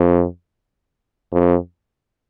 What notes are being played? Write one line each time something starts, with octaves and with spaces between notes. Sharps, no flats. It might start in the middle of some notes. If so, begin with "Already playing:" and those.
Already playing: F2
F2